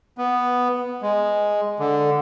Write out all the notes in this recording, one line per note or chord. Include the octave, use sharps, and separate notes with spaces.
B3
G#3
D3